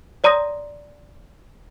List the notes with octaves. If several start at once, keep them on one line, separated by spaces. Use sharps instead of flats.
C#5 D5 A#5 C6 D#6 A#6